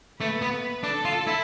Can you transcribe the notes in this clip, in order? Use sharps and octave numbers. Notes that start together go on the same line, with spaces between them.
A3 B4
B3
D4 A4
F4
E4